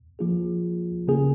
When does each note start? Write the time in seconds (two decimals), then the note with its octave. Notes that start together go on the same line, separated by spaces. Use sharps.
0.19 F3 A#3 F4 G#4
1.08 C#3 A#3 C#4 G#4